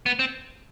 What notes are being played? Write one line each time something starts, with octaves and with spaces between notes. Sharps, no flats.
B3
C4